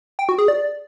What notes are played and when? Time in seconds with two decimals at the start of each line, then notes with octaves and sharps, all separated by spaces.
0.19 G5
0.29 F#4
0.38 G#4
0.48 D5